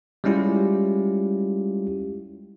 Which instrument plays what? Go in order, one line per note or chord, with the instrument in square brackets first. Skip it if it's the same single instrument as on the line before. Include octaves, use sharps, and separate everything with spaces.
[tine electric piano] G3 G#3 C#4 E4 F4 G4